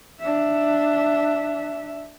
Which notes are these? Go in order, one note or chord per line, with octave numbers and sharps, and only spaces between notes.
D4 E5